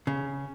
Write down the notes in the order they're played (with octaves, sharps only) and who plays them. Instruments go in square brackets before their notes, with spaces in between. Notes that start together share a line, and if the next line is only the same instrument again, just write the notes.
[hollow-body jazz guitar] C#3